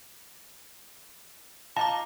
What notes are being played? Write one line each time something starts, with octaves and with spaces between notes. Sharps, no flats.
F4 D#5 F5 A5 A#5 D6